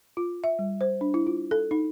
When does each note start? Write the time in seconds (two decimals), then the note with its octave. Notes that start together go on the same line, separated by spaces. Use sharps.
0.17 F4
0.44 E5
0.59 G3
0.81 C5
1.01 D4
1.14 E4
1.27 F4
1.51 A4
1.71 D#4